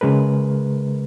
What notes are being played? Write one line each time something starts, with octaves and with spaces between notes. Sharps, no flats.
C#3 G#3 A#4 B4